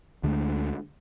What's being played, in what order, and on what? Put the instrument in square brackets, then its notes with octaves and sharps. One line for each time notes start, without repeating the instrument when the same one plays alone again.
[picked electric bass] D2 D3 G#3 A3